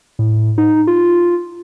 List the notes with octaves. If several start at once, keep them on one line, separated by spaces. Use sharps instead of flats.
A2
D#4
F4